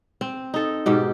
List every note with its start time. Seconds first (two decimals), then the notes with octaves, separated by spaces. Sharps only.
0.21 C4
0.54 D#4 A4
0.86 G#2 B2 G4